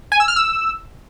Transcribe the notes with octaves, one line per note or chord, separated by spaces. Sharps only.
G#5
E6
F6
E6